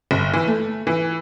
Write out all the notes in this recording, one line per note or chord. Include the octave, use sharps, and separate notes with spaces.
G1
E3
A3
E3